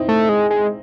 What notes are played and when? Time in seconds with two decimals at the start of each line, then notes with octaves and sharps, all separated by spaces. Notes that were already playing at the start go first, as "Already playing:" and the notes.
Already playing: C4 D#4 E4
0.09 A3
0.29 G#3
0.50 G#3